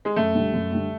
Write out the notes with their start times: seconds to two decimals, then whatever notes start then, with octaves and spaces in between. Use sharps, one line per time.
0.05 G#3
0.16 F#2 A3
0.35 D3 G3
0.54 F#2
0.72 D3 G3